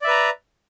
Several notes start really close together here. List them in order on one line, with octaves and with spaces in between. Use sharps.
D5 E5 B4 A#5